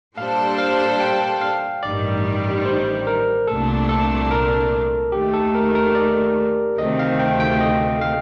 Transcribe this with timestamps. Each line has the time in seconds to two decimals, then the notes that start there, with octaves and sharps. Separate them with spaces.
0.17 A#2 G3 D4 A4 C5 F5
0.58 F5
1.00 G5
1.41 F5
1.83 A1 G2 D#3 G3 D5
2.65 C5
3.07 A#4
3.47 C2 A#2 A3 D4 A4
3.89 A4
4.31 A#4
5.12 D#2 D#3 A3 G4
5.33 A4
5.55 A#4
5.75 A#4
5.95 D5
6.78 D2 C3 D#3 A3 C4 D#5
6.99 F5
7.20 G5
7.40 G5
7.60 D#5
8.01 F5